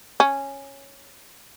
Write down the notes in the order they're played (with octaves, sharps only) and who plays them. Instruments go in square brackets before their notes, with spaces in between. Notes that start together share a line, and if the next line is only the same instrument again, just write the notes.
[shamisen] C#4